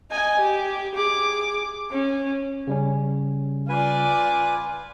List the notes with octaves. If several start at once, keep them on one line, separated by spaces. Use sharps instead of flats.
D#5 G#5
G4
G#4 D6
C#4
C#3 G3 C#4
F4 B4 D5 G#5